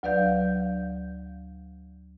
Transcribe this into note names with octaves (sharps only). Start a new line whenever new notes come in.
D2 F#3 B4 D5 F5 G6